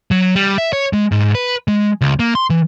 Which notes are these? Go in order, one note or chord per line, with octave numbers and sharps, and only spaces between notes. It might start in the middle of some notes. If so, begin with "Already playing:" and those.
F#3
G3
E5
C#5
G#3
G#2
B4
G#3
C#2
A#3
C6
E3